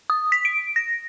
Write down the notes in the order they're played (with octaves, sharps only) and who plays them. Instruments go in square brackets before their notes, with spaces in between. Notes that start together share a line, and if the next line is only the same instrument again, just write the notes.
[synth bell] D#6
B6
D7
A#6